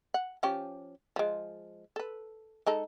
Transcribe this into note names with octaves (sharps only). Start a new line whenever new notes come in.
F#5
F3 C#4 G4
F3 G#3
A4 B4
G#3 D#4 A4